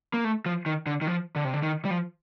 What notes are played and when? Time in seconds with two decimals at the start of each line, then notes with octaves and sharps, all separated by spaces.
0.14 A#3
0.24 A3
0.46 F3
0.66 D#3
0.86 D3
1.01 D#3
1.07 F3
1.36 D3
1.45 C3
1.54 D3
1.62 D#3
1.85 G3
1.90 F3